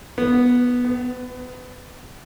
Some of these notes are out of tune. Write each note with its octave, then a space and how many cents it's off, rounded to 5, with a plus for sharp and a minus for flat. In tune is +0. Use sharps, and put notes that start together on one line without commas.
B3 -5
B3 +30